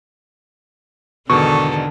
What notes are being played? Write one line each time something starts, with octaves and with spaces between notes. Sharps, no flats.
E2 G#2 B2 D3 D#3 A4 C#6